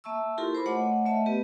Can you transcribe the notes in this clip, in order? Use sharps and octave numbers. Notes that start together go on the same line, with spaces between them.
A#3 E5 A5 C#6 E6
E4 F4 G4 A4 A#4 C6
C5 B5 D6
A3 C#5 D#5 F#5
A3 D#5 E5 A5
B3 G4 B4